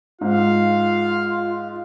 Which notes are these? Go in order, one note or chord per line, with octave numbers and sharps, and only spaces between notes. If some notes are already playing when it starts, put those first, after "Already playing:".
G#2 F4 F5